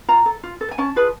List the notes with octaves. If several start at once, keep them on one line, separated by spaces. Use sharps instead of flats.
F4 A#5
A4
F4
A4
G#5
C#4 A5
F4 G#4 B4